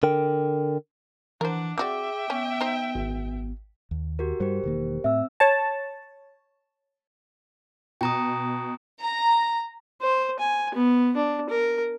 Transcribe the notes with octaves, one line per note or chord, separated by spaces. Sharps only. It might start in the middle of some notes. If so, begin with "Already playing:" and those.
D3 A#4 G5
E3 D4 A#4 C5 F#5
C4 F#4 G#4 D5 E5 G5 D6
B3 C#4
D#4 C5
G#1
D#2
F#4 G4 A#4
G2 G3 G4 A#4 C5
E1 D#3 A#3
A2 C4 E5 E6
C#5 A5
B2 G5 A#5 D#6
A#5
C5
G#5
B3
D4
A#4